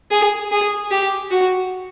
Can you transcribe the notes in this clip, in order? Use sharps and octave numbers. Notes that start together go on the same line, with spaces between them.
G#4
G#4
G4
F#4